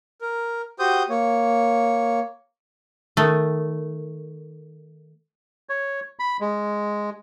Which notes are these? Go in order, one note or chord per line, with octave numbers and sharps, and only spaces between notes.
A#4
F#4 G4 C5 D#6 G6
A#3 C#5
D#3 A3
C#5
B5
G#3